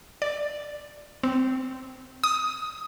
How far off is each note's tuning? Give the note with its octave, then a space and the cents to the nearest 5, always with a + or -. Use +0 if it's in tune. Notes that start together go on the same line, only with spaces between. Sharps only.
D5 +0
C4 -15
D#6 +5